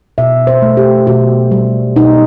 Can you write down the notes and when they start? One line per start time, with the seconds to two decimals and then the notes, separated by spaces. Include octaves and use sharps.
0.18 B2 E5
0.47 C5
0.62 A3
0.77 G4
1.07 B2 F#4
1.51 G3
1.96 B2 D#4